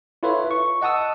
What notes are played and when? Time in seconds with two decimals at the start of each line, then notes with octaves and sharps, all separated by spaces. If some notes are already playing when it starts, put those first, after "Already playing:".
0.23 E4 F4 A4 B4 C#5 E5
0.51 C#6
0.82 D#5 F#5 A5 D#6 E6